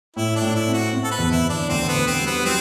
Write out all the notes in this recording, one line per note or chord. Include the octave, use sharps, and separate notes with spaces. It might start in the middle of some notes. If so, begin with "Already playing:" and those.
A2 E4
D4
A2
E4
C4
F#4
C4
A4
B4
E2
E4
E2
D4
D2 C4
B3
D2
C4
G3
B3
F#3 C4